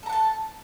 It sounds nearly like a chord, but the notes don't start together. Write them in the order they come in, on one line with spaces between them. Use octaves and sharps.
A4 A#5 F#5 A5